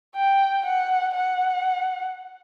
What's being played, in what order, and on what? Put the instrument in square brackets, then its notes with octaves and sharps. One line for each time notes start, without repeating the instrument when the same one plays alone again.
[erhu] G5
F#5
F#5